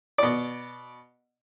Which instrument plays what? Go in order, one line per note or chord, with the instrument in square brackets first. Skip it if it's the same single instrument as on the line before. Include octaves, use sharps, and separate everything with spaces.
[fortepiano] B2 D5